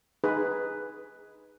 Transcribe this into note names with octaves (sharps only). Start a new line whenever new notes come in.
D#4 G#4 B4